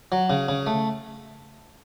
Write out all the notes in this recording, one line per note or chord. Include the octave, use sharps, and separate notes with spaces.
F#3
C#3
C#3
A3